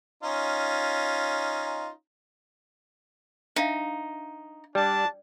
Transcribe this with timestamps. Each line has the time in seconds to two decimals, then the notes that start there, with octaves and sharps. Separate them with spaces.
0.23 C#4 D#4 F4
3.56 D4 D#4 E5 F5
4.75 G3 D4 D5 A5